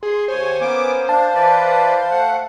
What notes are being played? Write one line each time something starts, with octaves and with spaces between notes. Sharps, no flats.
G#4 C6
D#2 C5 C#5 G#5
A#3 B3 C#4 G#5 D6
D4 F5 A5
E3 B4 D5
A3 F#5